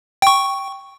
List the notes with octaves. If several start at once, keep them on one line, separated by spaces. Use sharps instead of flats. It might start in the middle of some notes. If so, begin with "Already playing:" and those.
G5 C#6